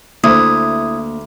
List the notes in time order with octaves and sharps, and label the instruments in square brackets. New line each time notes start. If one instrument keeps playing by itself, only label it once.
[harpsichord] D2 [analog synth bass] A#3 [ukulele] E4 C5 [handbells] D#6